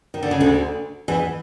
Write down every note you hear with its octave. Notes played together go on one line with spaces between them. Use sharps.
D#3
D3
C#3
D2 D3
E2 E3